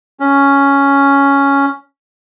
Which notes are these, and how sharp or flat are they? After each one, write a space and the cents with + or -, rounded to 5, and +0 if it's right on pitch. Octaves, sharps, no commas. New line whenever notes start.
C#4 +5